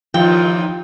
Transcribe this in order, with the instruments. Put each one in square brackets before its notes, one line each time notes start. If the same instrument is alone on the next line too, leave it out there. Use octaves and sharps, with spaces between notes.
[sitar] D#2 A#2 E3 [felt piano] F3 [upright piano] F4 [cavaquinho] G5